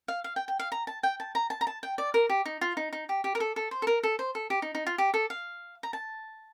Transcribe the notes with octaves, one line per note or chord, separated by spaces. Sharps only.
F5
F5
G5
G5
F5
A#5
A5
G5
A5
A#5
A5
A#5
A5
G5
D5
A#4
G4
D#4
F4
D#4
D#4
G4
G4
A#4
A4
A4
C5
A4
A#4
A4
C5
A4
G4
D#4
D#4
F4
G4
A4
F5
A#5
A5